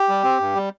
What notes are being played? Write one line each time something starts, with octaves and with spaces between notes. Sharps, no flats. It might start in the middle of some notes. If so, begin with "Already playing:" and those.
Already playing: G4
G3
C4
G2
G3